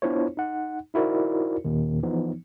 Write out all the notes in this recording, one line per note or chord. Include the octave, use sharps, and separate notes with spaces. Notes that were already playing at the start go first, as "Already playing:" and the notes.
B3 D4 E4 F4 C5 C#5
D#4 F#5
D#4 E4 F#4 A#4 C5 D5
D#2 A#2 D#3
E3 F3 B3 D#4